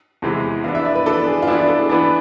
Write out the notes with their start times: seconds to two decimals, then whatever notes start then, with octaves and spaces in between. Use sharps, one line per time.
0.22 E2 C3 E3 G#3
0.64 E3 B3 D4 F5
0.75 E5
0.85 D5
0.95 B4
1.06 E3 B3 D4 A4
1.27 G#4
1.42 F4
1.47 E3 B3 D4 E4
1.59 D5
1.69 A4
1.79 G#4
1.89 E3 B3 D4 E4